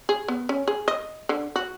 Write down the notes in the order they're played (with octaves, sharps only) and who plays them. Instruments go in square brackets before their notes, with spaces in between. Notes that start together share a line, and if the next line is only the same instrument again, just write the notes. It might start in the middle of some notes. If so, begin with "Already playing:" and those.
[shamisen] G#4
B3
C#4
G#4
D#5
D3
F#4